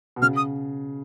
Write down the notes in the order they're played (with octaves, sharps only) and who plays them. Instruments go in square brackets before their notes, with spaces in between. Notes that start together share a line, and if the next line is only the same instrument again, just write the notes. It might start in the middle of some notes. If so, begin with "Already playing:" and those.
[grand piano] B2
[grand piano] C#3 [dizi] F6
[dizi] D#6